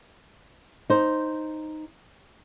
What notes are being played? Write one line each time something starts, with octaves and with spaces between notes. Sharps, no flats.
D#4 C5